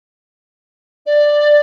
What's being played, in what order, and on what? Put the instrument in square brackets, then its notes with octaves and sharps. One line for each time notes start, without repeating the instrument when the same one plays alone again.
[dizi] D5